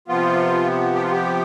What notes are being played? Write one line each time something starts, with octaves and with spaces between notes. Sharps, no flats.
C3 F3 B3 F4
G4
F4
G4